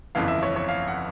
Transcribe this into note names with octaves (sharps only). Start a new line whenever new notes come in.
G1 F2 C#3 E3 F5
E5
C#5
C#5
F5
F#5